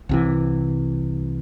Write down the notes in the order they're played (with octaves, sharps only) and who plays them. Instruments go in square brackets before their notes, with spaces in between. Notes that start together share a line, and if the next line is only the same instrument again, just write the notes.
[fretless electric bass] C2 C3 E3